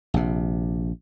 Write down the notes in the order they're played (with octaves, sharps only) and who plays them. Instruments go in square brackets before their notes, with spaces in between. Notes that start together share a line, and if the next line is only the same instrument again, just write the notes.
[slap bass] A#1 C3